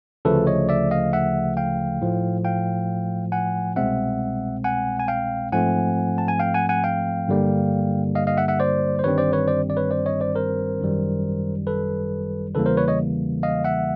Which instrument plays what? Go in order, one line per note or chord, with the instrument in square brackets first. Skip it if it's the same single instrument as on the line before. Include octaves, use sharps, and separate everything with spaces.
[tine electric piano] D2 C#3 F3 A3 A4 B4
C#5 D#5
D5 E5
D#5 F5
E5 F#5
F5 G5
A2 F3 A3
F5 G5
F#5 G#5
C2 B2 G#3 C4 E5 F#5
F#5 G#5
G#5
F5 G5
G#2 F3 A3 C4 F#5 G#5
A5
G#5
F5 G5
F#5 G#5
F#5 G#5
F5 G5
G2 D3 G3 A#3
D#5 F5
D#5 F5
E5 F#5
E5 F#5
C5 D5
C5
G1 G2 D#3 G3 C4 B4 C#5
C5 D5
B4 C#5
C5 D5
D5
B4 C#5
C5 D5
C#5 D#5
C5 D5
A#4 C5
G#1 F#2 D#3 G3
A4 B4
E2 C#3 E3 G3 A#3 A4 B4
A#4 C5
B4 C#5
C#5 D#5
D#5 F5
E5 F#5